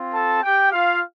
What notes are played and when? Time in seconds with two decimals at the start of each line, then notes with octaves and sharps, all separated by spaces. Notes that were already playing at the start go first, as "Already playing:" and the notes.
Already playing: C4 F4
0.14 A4 A5
0.43 G4 G5
0.72 F4 F5